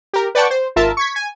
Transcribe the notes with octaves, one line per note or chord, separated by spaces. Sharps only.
G4 A#4
B4 D5 F#5 G5 A5 C#6
C5
G#1 F4 A#4 E5 A5
C#6 G#6 B6
G#5